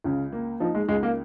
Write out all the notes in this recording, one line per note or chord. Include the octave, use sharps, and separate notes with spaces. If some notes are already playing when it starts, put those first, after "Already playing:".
C#2 C#3
A#3
F3 D#4
G#3
C#2 G#3
A#3